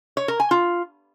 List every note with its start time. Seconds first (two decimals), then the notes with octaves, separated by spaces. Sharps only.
0.17 C#5
0.28 A#4
0.40 G#5
0.51 F4